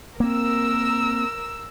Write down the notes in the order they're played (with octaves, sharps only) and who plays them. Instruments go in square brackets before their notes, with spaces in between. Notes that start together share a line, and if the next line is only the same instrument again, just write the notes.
[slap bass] A#3 C4 [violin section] A#4 E6